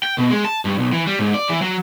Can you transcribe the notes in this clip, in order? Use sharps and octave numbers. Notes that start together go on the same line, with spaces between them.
G5
B2
G#3
A5
G2
B1
E3
G3
G#2
D5
E3
F#3